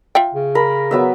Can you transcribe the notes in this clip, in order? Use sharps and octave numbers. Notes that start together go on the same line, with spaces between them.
F4 E5 G5
C#3
A#4 B5
F#3 B3 E5